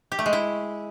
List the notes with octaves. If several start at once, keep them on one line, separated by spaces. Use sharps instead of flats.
G4
A3
G#3
E4